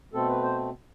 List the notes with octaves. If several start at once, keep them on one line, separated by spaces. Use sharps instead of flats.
B2 A3 C4 A4
B4
C5